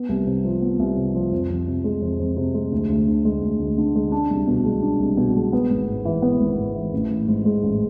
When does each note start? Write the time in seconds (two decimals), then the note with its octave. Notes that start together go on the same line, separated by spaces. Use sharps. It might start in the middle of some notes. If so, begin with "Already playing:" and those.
Already playing: B3
0.09 C2
0.26 C3
0.45 F3
0.62 B3
0.79 C2
0.97 C3
1.15 F3
1.31 F2
1.50 F2
1.67 C3
1.84 G#3
2.02 F2
2.19 F2
2.37 C3
2.54 G#3
2.72 D2
2.89 D2
3.07 D3
3.25 G#3
3.42 D2
3.59 D2
3.78 D3
3.95 G#3
4.12 D4
4.31 C2
4.47 B2
4.64 G#3
4.82 D4
4.99 C2
5.17 B2
5.35 G#3
5.53 B3
5.70 G#1
5.88 G#2
6.05 E3
6.22 B3
6.40 G#1
6.58 G#2
6.75 E3
6.93 A1
7.11 A1
7.28 G#2
7.45 G#3
7.63 A1